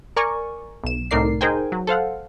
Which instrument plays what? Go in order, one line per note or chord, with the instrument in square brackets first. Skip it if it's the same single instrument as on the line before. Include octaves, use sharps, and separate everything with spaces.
[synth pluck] A#4 D5 G#5 C#6
B1 E7
C2 A2 D#4 A#4 D5 C7
D#4 G#4 A#4 C5 G5 G#5
F#3
A4 C5 F5 F#5